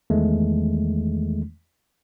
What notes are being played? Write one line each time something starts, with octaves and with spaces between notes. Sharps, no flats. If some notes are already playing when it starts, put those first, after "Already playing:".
E2 D#3 E3 G#3 A3